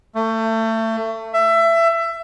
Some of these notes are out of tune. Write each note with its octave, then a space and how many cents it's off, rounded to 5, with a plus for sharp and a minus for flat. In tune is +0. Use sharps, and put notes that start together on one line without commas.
A3 +25
E5 +20